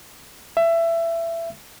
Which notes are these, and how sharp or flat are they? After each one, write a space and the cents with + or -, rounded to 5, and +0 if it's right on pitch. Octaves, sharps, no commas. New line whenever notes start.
E5 +20